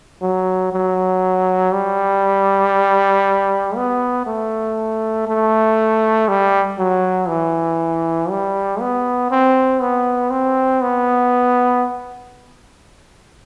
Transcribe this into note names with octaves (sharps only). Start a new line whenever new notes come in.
F#3
F#3
G3
B3
A3
A3
G3
F#3
E3
G3
B3
C4
B3
C4
B3